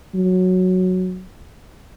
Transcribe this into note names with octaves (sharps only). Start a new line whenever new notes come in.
F#3